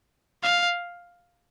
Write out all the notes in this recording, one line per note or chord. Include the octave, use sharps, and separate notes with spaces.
F5